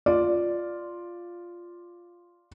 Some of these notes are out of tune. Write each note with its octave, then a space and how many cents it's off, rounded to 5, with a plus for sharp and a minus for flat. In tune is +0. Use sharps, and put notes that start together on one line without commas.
F4 +0 D5 +0